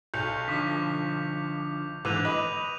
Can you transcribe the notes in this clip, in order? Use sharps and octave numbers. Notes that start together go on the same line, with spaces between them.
B1 G6 C#7 F7
D3 F3 D6 B6
G#2 D3 E3 D6 D#7 F7
B4 D#5